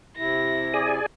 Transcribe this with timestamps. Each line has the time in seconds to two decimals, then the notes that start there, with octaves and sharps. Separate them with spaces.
0.17 C3 E4 A#6
0.74 G#4 D5 G#5